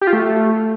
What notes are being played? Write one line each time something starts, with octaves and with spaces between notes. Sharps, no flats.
G4
F4
A3